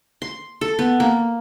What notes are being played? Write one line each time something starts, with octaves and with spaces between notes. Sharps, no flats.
C6
A4
B3
A#3